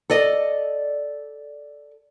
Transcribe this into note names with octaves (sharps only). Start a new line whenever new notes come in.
A4 D5 D#5